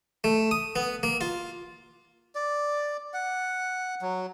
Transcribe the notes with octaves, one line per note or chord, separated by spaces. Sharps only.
A3
D#6
B3
A#3
F4
D5
F#5
F#3